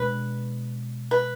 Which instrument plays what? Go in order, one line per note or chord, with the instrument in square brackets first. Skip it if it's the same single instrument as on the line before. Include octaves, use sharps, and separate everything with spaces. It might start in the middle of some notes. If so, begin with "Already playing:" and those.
Already playing: [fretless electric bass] B2 G#3 D4 [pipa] B4
[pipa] B4